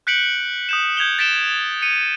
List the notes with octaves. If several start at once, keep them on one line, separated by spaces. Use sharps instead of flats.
F#6 G6 B6 C#7 D7 F#7
D#6 G6 E7
G6 G#6 F7 G7
A6 B6 D7 E7 G7
C#7 D#7